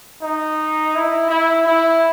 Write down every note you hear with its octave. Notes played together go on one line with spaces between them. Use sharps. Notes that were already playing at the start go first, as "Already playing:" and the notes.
D#4
E4
E4
E4